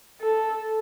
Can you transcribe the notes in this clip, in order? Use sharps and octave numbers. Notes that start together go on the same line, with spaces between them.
A4